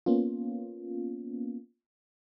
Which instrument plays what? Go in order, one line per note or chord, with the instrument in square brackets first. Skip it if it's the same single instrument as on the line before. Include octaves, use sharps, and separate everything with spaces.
[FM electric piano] A#3 B3 C#4 F4